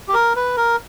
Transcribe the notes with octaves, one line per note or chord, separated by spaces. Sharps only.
G4
A#4
B4
A#4